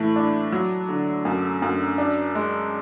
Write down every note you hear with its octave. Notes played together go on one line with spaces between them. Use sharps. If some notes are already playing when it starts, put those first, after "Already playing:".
Already playing: A2 E3 A3
D4
F#3
D3
F#2
F#2
D4
G#3